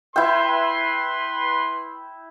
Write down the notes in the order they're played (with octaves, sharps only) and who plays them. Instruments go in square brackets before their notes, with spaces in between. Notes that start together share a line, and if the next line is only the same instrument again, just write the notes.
[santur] E4 G5 [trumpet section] B4 C6